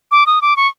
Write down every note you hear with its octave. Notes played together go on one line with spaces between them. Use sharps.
D6
D#6
D6
C#6